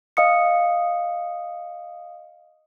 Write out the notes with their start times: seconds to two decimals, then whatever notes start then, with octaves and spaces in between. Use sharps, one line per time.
0.17 D#5 F5 D#6 C#7